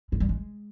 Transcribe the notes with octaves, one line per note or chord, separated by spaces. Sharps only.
G#3
G3
G#3